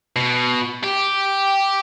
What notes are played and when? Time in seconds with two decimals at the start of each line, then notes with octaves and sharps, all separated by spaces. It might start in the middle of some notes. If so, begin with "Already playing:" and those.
0.16 B2
0.84 G4